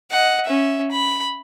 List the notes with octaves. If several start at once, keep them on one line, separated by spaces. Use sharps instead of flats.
D#5 F#5
C#4 E5
B5